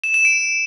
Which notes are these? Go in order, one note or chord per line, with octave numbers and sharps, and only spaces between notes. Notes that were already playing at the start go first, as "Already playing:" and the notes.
E7
E7
D7